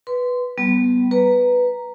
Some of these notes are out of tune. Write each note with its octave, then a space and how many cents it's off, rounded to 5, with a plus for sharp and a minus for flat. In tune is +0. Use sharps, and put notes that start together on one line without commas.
B4 +0 C6 -15
G3 -35 B3 +0
B4 +0 A#5 +0